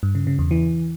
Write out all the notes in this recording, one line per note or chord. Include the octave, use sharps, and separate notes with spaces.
G2
C#3
C#3
E2
E3